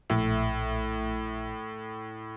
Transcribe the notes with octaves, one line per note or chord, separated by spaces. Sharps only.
A#1 A2 A3 E5